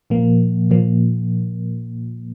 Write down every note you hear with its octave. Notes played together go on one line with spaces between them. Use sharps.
A#2 F3 A#3
A#2 F3 A#3